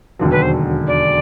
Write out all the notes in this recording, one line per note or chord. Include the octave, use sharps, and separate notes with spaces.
E1 D#2 D3 F#3
B4
C5
D5